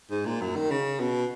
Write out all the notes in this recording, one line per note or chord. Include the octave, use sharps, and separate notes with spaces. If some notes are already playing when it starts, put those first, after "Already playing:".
G#2
A#2
F#2
D#3
C#3
B2